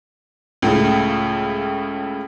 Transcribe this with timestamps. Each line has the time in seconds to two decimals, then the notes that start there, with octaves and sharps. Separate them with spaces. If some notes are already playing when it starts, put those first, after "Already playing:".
0.62 C#2 A2 C#3